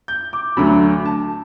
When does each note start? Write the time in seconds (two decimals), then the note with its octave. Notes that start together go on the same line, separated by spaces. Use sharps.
0.08 G6
0.33 D6
0.57 D2 D3 F#3 B5
1.05 A5